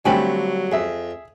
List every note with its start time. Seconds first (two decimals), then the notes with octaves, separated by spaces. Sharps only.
0.05 G2 D3 F#3 A3 C4 G5 G#5 B5
0.72 F2 G#4 E5